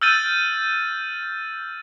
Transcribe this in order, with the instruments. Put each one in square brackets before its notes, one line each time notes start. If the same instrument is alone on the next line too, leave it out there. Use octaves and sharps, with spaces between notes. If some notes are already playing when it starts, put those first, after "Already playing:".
[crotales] E6 F6 G6 A6 D#7 F#7